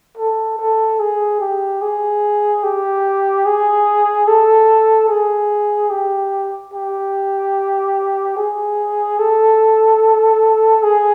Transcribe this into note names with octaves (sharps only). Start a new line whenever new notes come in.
A4
A4
G#4
G4
G#4
G4
G#4
A4
G#4
G4
G4
G#4
A4
G#4